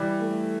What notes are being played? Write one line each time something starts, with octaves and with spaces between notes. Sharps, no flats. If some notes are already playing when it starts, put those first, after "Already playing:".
Already playing: E3 G3
A3